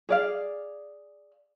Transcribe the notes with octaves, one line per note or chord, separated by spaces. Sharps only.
G#4 D5 F5